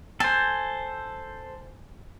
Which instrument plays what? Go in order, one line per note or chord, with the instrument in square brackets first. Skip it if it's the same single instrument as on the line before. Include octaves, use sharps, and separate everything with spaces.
[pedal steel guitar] A4 C5 [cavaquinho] G#5